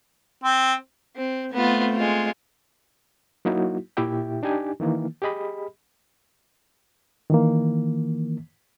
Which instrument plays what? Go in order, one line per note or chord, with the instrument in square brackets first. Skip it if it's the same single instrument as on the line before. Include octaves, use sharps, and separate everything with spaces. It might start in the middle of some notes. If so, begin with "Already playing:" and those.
[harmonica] C4
[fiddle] C4
[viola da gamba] A3 C4 [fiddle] B3 F4
[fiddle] G#3 F4
[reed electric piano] F#3 A#3 D#4 E4 F#4
A#2 E4 G4 E5 G5
D4 D#4 G4 G#5
D#3 E3 A#3
G4 G#4 D#5 B5
D#3 E3 A#3